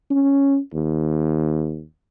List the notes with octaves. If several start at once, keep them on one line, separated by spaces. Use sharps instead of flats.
C#4
D#2